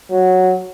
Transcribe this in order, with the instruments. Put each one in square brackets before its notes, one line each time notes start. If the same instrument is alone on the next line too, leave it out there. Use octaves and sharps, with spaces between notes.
[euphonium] F#3